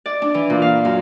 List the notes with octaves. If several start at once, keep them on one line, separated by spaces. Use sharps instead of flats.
D5
D4
E3
A#2
F5
F#2